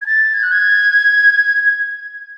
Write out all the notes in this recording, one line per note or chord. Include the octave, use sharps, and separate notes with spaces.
G#6
A6
G#6
F#6
G#6